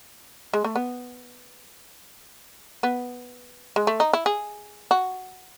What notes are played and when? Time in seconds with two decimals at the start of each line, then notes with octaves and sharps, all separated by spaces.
0.53 G#3
0.64 A3
0.76 B3
2.83 B3
3.76 G#3
3.87 A3
4.00 D#4
4.13 E4
4.26 G#4
4.91 F#4